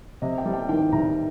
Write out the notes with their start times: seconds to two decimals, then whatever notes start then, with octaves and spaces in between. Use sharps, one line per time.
0.22 C3 D#5
0.38 G5
0.46 G3
0.53 G5
0.69 D#3 G5
0.92 C2 A#5